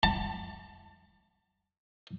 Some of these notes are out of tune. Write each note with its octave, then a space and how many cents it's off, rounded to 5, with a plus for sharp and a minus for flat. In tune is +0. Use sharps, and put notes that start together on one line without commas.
A5 +25